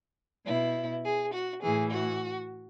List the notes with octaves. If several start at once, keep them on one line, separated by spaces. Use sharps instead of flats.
B2 E4
G#4
F#4
A2 E3 G#4
F#4